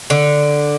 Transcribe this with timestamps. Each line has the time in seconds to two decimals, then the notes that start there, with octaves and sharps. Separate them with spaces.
0.10 D3